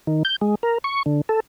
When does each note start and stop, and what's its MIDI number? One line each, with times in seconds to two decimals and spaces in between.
0.07 0.23 51
0.25 0.36 91
0.41 0.55 56
0.63 0.78 70
0.84 1.03 85
1.06 1.21 50
1.29 1.40 69